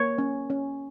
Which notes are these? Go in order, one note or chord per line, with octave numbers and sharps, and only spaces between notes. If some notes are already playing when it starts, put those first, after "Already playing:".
Already playing: A#3 C#5
C#4
C#4